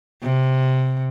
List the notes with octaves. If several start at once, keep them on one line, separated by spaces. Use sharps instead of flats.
C3